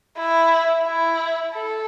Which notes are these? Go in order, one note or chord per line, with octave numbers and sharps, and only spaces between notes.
E4
E4
A4